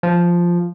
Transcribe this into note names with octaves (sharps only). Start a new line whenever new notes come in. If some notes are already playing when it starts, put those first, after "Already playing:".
F3